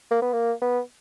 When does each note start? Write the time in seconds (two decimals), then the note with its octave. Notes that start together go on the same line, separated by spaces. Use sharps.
0.11 A#3
0.22 B3
0.33 A#3
0.62 B3